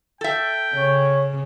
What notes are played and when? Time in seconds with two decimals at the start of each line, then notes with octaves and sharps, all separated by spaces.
0.21 A4 E5 G5
0.75 C#3 C#5